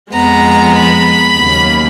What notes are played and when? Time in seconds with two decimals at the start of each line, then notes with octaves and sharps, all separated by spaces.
0.12 F2 F3 G#3 B3 A#5
0.76 B5
1.38 D#2 C#3 F#3 A#3